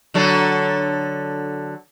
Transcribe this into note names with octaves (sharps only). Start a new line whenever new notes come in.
D3 F#3 A4